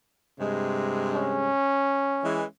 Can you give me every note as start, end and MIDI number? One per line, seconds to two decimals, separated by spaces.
0.39 1.50 43
0.39 1.50 48
0.39 1.50 56
1.14 2.49 61
2.24 2.43 52
2.24 2.43 56